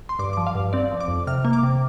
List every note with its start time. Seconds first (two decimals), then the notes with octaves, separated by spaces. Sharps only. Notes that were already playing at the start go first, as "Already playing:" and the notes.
0.09 C6
0.19 G2 D6
0.33 F3 D6
0.47 F5
0.55 G2
0.73 C4 D5
0.92 F3
1.00 D6
1.08 F2
1.27 C3 F6
1.45 A#3
1.53 D6
1.63 C3